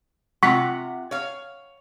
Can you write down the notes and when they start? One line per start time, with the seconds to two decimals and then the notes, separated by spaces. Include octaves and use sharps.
0.43 C3 F4 F#5 C#6 B6
1.11 C#5 F5